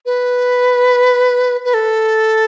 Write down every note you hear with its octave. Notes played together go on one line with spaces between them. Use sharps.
B4
B4
A4